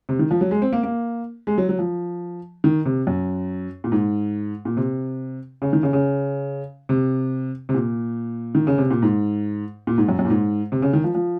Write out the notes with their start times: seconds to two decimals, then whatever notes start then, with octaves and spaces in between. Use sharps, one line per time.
0.09 C3
0.19 D#3
0.31 F3
0.41 F#3
0.51 G#3
0.62 C4
0.73 A#3
0.83 A#3
1.47 G#3
1.58 F#3
1.69 F#3
1.79 F3
2.64 D#3
2.86 C3
3.07 F#2
3.84 A#2
3.92 G#2
4.65 A#2
4.77 C3
5.62 C#3
5.73 D#3
5.83 C#3
5.93 C#3
6.89 C3
7.69 C3
7.75 A#2
8.55 D#3
8.67 C#3
8.78 C3
8.91 A#2
9.02 G#2
9.87 A#2
9.98 G#2
10.09 F#2
10.19 F#2
10.25 A#2
10.30 G#2
10.72 C3
10.82 C#3
10.93 D#3
11.04 F3
11.15 F3